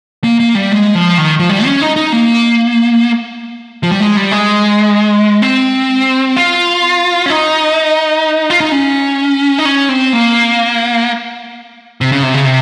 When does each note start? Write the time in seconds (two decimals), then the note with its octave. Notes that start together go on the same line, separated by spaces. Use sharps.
0.24 A#3
0.40 A#3
0.55 G3
0.72 G#3
0.95 F3
1.18 D#3
1.39 F3
1.49 G3
1.65 C#4
1.82 D#4
1.96 D#4
2.12 A#3
3.83 F3
3.92 G3
4.00 G#3
4.17 G3
4.31 G#3
5.42 C4
6.37 F4
7.26 C#4
7.30 D#4
8.50 F4
8.61 D#4
8.72 C#4
9.58 D#4
9.65 C#4
9.89 C4
10.13 A#3
12.01 C3
12.12 C#3
12.23 C3
12.34 C#3
12.45 C3